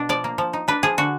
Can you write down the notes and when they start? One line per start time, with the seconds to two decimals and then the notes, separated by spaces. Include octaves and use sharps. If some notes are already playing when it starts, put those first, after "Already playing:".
Already playing: B2 D4
0.09 F3 D5
0.24 A#3
0.38 F3
0.53 D#4
0.68 D4 B4
0.83 F3 G#4
0.98 D3 F#4